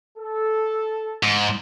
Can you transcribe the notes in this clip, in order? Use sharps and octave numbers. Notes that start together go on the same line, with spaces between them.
A4
G#2